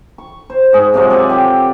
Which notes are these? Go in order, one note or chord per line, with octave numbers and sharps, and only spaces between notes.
C#6
C5
G#2 G#4
C3 F3 F#3 G#3
A4 D5 G#5
G4 G5